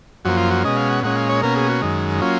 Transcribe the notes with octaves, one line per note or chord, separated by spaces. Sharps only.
F#2 F3 A#3 F#4
F4
F#4
B2 G#3 C#4 D#5
F5
F#5
A#2 G#3 C#4 F#5
F5
C#5
B2 A#3 C#4 A#4
G#4
F#4
F#2 D#3 G#3
F#3 A#3 C#4 F4